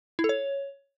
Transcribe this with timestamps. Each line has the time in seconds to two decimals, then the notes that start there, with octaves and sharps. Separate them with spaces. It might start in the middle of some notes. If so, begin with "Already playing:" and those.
0.19 E4
0.24 A4
0.29 C#5